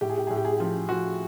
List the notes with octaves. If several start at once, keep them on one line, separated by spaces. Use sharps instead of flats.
A2 G4
G#4
G4
A2 G#4
G4
G#4
G4
F3
F3 F#4